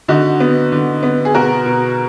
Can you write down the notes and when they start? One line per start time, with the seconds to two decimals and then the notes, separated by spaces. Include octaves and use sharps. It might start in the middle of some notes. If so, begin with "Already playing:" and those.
0.08 D3 D#4 F#4
0.40 B3
0.72 D3
1.03 B3
1.25 G#4
1.35 B2 F#4 A#4
1.66 B2